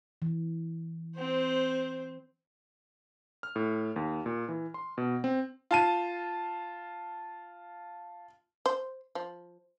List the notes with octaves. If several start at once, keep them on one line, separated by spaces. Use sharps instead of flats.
E3
C4 C5
F6
A2
D#2
A#2
E3
C6
B2
C4
F4 A5 D#7
C5
F3